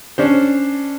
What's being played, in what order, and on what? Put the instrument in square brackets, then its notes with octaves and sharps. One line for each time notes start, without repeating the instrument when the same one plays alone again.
[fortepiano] C#4 D4 C5